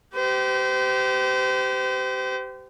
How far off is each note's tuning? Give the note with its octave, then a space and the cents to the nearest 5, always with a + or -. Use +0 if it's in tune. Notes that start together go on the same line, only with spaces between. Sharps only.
G4 -20 C5 -35